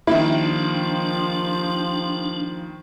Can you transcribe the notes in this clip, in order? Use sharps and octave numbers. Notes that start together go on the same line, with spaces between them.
D#3 F3 G3 A#3 D4 E4